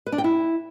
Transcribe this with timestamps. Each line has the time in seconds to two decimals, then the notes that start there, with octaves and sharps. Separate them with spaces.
0.06 B4
0.12 D4
0.18 G5
0.24 E4